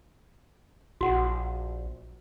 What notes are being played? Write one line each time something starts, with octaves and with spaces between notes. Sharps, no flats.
A#1 F#4 F#5